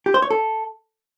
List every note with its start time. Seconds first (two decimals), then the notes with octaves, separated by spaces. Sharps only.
0.06 G4
0.14 C5
0.22 C#5
0.30 A4